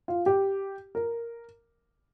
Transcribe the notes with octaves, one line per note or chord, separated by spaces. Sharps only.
F4
G4
A#4